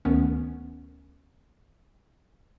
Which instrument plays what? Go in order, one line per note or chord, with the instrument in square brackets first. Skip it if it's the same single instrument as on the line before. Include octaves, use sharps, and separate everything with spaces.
[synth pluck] D2 D#3 B3 C#4